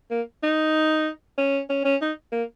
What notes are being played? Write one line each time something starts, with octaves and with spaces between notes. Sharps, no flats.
A#3
D#4
C#4
C#4
C#4
D#4
A#3